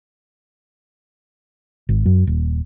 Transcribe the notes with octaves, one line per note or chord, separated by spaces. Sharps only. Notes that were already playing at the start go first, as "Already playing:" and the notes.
G#1
F#2
D#1